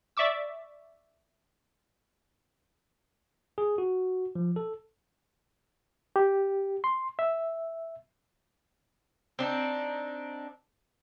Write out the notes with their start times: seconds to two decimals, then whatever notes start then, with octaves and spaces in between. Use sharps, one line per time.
0.17 D5 E5 C#6 D6 E6
3.58 G#4
3.78 F#4
4.35 F3
4.56 A4
6.16 G4
6.84 C6
7.19 E5
9.39 C4 D4 D#4